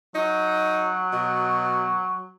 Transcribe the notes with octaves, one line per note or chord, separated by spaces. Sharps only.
F#3 D#4
B2